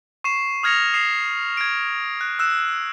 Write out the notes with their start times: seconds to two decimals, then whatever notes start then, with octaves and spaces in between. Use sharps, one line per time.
0.24 C#6 C7 E7
0.63 D#6 F6 G#6 A#6 C#7 F7
0.93 D#6 C7 E7
1.57 G#6 D7
2.21 F#6
2.39 E6 F#6 E7